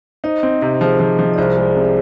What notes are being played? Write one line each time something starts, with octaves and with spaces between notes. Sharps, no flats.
D#4 C5 D#5
C4
C3
F3 G#4 C5
F3
F3
D5
C2 G#4 C5
G#3
C3